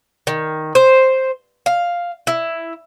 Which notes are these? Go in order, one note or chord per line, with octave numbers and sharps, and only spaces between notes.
D#3
C5
F5
E4